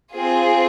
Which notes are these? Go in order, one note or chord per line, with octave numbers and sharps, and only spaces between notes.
C4 F4 G#4